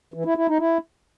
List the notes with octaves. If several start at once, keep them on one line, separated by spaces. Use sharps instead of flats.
E3
E4
E4
D#4
E4